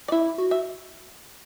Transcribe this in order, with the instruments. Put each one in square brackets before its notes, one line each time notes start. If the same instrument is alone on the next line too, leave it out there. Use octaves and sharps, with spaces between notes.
[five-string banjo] D5
[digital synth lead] E4 [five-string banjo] E5
[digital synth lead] F#4
[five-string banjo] E5